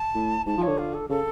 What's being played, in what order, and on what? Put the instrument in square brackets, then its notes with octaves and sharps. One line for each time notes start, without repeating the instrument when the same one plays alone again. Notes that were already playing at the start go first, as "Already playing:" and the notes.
Already playing: [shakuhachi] A5
[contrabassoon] A2
[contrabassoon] G#2 [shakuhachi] A5
[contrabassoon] F3
[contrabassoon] D3 [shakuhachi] C#5
[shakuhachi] F4
A4
[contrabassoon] C#3 [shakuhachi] A4